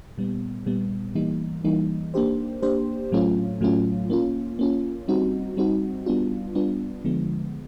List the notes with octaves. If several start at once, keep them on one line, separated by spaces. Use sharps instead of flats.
A#2 G3 B3
A#2 G3 B3
E3 G3 A#3 D#4
E3 G3 A#3 D#4
A#3 D4 G4 C5
A#3 D4 G4 C5
A2 F#3 A3 C#4 F4
A2 F#3 A3 C#4 F4
A#3 C#4 F4
A#3 C#4 F4
G3 C4 D#4 F#4
G3 C4 D#4 F#4
G3 B3 D4 F4
G3 B3 D4 F4
D3 F3 G#3 B3